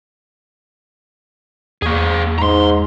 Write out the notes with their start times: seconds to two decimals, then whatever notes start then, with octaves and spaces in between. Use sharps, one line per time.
1.82 E2 A#3 G#4 C#6
2.39 G#2 A#5 C6